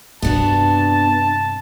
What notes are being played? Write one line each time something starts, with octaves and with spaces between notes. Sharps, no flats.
G2 C3 B3 D4 F#4 A5